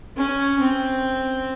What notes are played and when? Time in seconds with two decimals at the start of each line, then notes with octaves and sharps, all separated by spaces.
0.16 C#4
0.60 C4